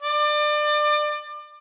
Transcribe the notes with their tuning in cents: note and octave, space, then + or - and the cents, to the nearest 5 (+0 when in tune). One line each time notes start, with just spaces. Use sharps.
D5 +30